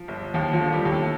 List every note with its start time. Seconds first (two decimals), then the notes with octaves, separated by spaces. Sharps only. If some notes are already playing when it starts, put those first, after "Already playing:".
Already playing: F3
0.08 G1
0.34 D#2 F3 F4
0.53 F3 F4
0.60 D3
0.72 G3 G4
0.85 D#2
0.92 A3 A4